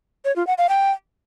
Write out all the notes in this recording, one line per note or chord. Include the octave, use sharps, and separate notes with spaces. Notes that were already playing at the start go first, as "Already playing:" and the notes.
C#5
F4
F#5
F5
G5